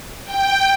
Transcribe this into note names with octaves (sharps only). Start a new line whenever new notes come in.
G5